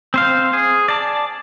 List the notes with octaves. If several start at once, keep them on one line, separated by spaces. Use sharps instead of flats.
C4 C5 F5
G#4
D5 A5